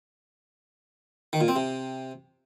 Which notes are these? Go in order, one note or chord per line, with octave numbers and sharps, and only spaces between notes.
D#3
A#2
C4
C3